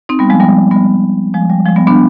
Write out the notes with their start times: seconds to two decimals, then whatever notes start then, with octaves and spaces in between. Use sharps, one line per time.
0.09 C4 D#4
0.19 G3 B3
0.30 F3 G#3
0.40 G3 B3
0.71 G3 B3
1.34 F3 G#3
1.49 G3
1.66 F3 G#3
1.76 G3 B3
1.87 B3 D4